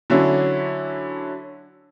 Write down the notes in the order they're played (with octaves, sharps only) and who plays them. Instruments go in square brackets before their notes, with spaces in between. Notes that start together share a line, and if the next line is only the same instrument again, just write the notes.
[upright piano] D3 F#3 C#4 D4 E4